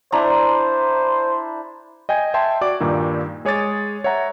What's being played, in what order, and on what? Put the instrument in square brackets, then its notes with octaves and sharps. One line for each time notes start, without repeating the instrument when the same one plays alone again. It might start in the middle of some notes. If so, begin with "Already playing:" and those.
[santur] D4 E4 A#5 [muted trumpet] C5
[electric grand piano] D#5 G5 G#5 G#6
E5 G5 A5 C6
F#4 D5 D6
G2 A#2 D#3 A#3
G#3 G#4 C#5 D6 D#6 A6
C#5 E5 F#5 A#5